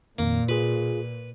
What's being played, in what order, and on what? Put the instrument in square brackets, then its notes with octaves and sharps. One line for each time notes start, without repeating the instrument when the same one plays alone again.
[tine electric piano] F2 D#3 [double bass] A#2 [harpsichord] A#3
[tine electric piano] F4 G#4 [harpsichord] B4